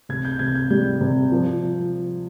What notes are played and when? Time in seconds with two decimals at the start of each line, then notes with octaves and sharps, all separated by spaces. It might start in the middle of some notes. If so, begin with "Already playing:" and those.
0.09 C3 G#6
0.25 G6
0.39 C3 G#6
0.55 G6
0.70 G3 G6
1.01 C3
1.32 F3